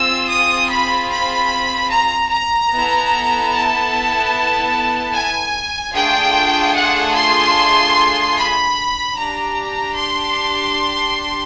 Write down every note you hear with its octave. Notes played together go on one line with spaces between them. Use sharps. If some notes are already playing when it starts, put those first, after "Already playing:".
Already playing: C4 F4 G#4 E6
D#6
B5
B5
A#5
A#5
B3 E4 A4
A5
G#5
A3 D4 F4 G#4 G5
F#5
C6
B5
D4 G4 A#5
C6